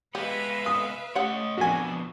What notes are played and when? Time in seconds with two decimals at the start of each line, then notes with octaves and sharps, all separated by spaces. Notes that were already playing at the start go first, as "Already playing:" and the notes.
0.15 G#3 B3 G4 B4 E5 F5
0.66 D#6
1.15 A3 C#4 G4 C#5 D#5 F#5
1.58 F2 B2 F3 D4 F#4 G#5